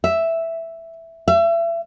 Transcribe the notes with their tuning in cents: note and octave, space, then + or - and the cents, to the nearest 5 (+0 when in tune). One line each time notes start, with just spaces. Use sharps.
E5 +0
E5 +35